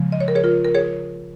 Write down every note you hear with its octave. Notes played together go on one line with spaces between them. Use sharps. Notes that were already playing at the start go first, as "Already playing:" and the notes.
Already playing: C#3 F3 G#3
D#5
C#5
A#4
G#4 C#5
F4 A#4
A#4
G#4 C#5